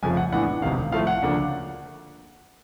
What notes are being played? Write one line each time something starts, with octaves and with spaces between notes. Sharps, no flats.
F1 F2 C#3 F3 A3 G#5
F#5
A2 E3 G#3 B3 D4 F#5
E1 D2 C3 D#3 F5
A2 F3 A3 F5
F#5
D2 C#3 F3 A#3 D4